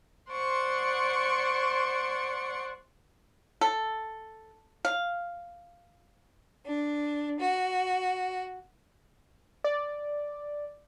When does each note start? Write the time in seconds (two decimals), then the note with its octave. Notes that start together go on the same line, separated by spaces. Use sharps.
0.31 C5 D5 F#5 C6 C#6
3.61 A4
4.85 F5
6.65 D4
7.39 F#4
9.64 D5